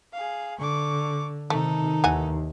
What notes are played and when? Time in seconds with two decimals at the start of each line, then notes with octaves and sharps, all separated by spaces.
0.13 G#4 F5
0.59 D3 C#6 D6
1.50 C3 D#3 A3 D#4 A4
2.04 D#2 E3 F#5 G#5